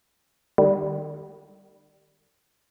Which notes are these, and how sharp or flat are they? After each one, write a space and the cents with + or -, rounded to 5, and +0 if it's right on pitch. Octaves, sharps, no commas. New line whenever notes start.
D#3 -35 G3 +0